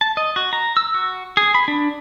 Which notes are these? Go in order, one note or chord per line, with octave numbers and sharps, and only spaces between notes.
A5
D#5
F#4
A#5
E6
F#4
G#4
B5
D4